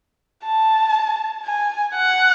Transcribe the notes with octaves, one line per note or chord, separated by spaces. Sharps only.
A5
G#5
F#5